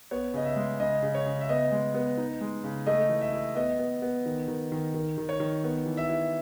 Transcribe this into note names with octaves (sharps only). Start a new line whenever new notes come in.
B3 C#5
C#3 D#5
E5
G#3
C#3 D#5
C#3
C#5
C#3
E5
B3 D#5
G#3
B3
D#4
G#3
C#3
A3 D#5
E3
E5
E4
B3 D#5
B3
B3
D#3
D#3
D#3
D#3
D#3
C#5
D#3
B3
E3
E5
E4